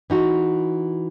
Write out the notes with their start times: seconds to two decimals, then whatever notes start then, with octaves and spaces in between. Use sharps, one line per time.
0.10 E3 D#4 F#4